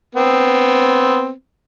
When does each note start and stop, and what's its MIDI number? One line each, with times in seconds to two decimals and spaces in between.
0.15 1.31 59
0.15 1.31 60